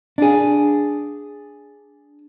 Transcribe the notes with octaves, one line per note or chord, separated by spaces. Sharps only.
D4 G#4